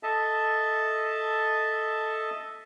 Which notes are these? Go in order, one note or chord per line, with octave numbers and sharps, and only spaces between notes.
A4 D#5 E5 A5